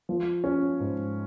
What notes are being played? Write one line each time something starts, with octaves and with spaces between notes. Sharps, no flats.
F3
C#4
G#2